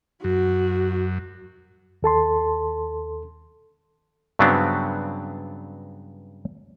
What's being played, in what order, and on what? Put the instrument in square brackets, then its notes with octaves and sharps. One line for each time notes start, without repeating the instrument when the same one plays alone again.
[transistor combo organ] F#2 [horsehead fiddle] F#4
[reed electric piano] D#2 A4 A5 C6
[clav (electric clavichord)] G2 C#3 F#3 B3 C4 D4